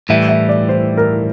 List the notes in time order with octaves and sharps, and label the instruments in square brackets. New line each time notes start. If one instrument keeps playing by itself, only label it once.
[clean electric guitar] A2 E3 G3 [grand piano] E5
[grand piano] E5
D5
C5
A#4